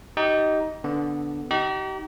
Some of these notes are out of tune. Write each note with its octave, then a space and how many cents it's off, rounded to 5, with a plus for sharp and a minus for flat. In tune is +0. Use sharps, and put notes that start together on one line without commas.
D#4 +10 G4 -25
D3 -5 B3 +0
D#4 +0 G4 -40 D#5 +0